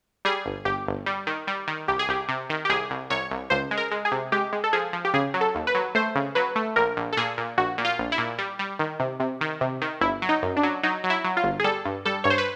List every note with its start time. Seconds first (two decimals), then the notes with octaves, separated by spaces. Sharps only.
0.25 G3 G#4
0.46 G1
0.65 G1 G4
0.87 G1
1.06 G3
1.27 D#3
1.47 G3
1.68 D#3
1.88 C2 G4
1.99 G#4
2.08 C2 G4
2.29 C3
2.50 D#3
2.65 G4
2.69 C2 G#4
2.90 C2
3.10 C2 C#5
3.31 C2
3.50 C#2 C5
3.71 G#3
3.77 A#4
3.91 G#3
4.05 G#4
4.12 C3
4.32 G#3 G4
4.53 G#3
4.64 A4
4.73 F3 G#4
4.93 F3
5.05 G4
5.14 C#3 G#4
5.34 F#3
5.41 A4
5.55 D#2
5.67 B4
5.75 F#3
5.95 A3 C5
6.15 C#3
6.35 F#3 B4
6.56 A3
6.76 A#1 A#4
6.97 A#1
7.13 A4
7.17 A#2 G#4
7.38 A#2
7.57 A#1 F#4
7.78 A#2
7.85 F4
7.99 A#1
8.12 E4
8.18 A#2
8.38 G3
8.59 G3
8.79 D#3
9.00 C3
9.20 C3
9.41 D#3
9.61 C3
9.82 D#3
10.01 G1 E4
10.22 F#3
10.29 D#4
10.43 F#2
10.57 D4
10.63 F#3
10.83 F#3 D#4
11.04 F#3
11.10 E4
11.24 F#3
11.37 F4
11.44 G1
11.60 G#4
11.64 G3 A4
11.85 G2
12.05 G3 A4
12.24 G2 C#5
12.30 C5
12.38 B4